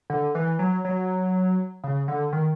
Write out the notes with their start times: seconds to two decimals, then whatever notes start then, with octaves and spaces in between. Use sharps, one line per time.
0.10 D3
0.35 E3
0.59 F#3
0.85 F#3
1.84 C#3
2.08 D3
2.33 D#3